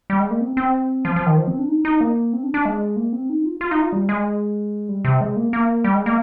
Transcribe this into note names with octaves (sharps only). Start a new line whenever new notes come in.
G3
G#3
A#3
C4
C4
F3
F3
D#3
F3
C4
D4
D#4
D#4
A#3
C4
D4
D4
G#3
A#3
C4
D#4
F4
F4
D#4
F4
G3
G#3
G3
C3
G#3
A#3
A#3
G3
G#3
A#3